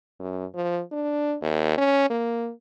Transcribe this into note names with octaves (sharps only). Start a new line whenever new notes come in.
F#2
F3
D4
D#2
C#4
A#3